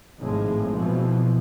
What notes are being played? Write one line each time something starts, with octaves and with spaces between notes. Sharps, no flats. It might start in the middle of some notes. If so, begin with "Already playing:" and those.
G#1 A2 F3 G#3
B2 E3 F3